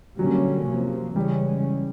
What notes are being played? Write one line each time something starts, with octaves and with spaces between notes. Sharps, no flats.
D3 F#3 G3 A#3 C#4
C3 F3 A#3
C#3 E3 G3 G#3 C#4